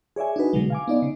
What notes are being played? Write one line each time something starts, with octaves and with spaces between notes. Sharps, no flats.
G#4 C#5 D5 E5 G#5
D4 D#4 F#4 B4
B2 D3 F#3 G#3
F5 G#5 D6
B3 D#4 D5
C#3